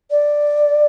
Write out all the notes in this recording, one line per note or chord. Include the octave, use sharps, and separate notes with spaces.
D5